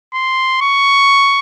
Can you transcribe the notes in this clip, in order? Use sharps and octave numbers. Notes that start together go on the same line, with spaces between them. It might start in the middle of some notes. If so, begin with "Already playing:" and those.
C6
C#6